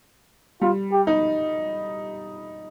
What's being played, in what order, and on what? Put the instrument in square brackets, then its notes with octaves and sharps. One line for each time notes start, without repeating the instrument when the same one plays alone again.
[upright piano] G3 [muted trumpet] F4
[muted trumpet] G4
[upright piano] D#4